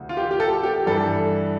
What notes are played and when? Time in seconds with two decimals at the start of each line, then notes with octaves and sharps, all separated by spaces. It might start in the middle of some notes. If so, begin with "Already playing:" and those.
Already playing: D2 C3 E3
0.09 F4
0.17 G4
0.31 G4
0.40 A4
0.63 G4
0.87 G2 E3 A4